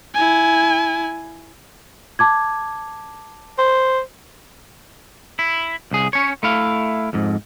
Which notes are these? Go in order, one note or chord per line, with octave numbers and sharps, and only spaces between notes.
E4 G#5
A5 D6 G#6
C5
E4
C2 G#4
C#4 C#5
A3 E4 F5
F2 G#2